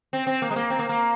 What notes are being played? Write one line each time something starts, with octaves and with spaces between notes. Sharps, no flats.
C4
C4
A#3
G#3
A#3
C4
A#3
A#3